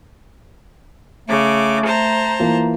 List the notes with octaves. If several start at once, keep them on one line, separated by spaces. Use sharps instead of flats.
C#3 A3 D6
C5 A5 A#5
E3 A#3 F4